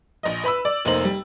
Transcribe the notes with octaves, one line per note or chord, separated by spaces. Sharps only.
A#1 D#5
B4 B5 E6
D5
F1 A#3 D#4 C5 F#7
G3